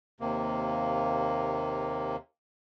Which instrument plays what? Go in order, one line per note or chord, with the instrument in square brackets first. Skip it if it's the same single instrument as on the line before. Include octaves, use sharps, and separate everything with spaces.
[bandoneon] D#2 C3 A#3